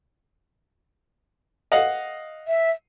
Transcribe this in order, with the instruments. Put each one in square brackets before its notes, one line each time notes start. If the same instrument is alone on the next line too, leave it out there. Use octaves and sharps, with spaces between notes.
[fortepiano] D#5 F5 F#5
[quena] E5